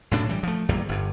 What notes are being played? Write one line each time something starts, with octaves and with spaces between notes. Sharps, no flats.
B1 A2 D4
E3 G3
F3 A3
G#1 E2 G3 A#3
G1 G2